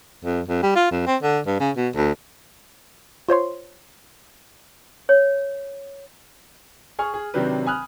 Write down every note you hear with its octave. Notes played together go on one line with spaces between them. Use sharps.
F2
F2
G3
F4
F2
C4
D3
G2
C#3
B2
D2
F4 C5 C#5 C6
C#5
G#4 G#5 C#6 F6
G#4
C3 D#3 F#3 C4 D4 B4
G#5 B5 D#6 F6 F#6